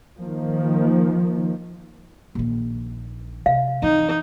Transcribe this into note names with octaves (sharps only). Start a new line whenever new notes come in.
D#3 F3 A#3
A#1 D#3
C3 F5
F2 E3 D#4